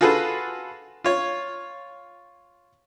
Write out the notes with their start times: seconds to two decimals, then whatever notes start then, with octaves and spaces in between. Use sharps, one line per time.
0.01 F4 F#4 G#4 A4 B4
1.04 F4 C#5